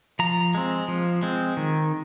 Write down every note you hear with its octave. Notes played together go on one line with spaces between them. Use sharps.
F3 A#5
G#3 C4
F3
G#3 C4
D#3